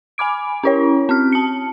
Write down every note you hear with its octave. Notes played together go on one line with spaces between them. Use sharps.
G#5 B5 D6 D7
C#4 E4 C#5
C4 F6
A5 C#7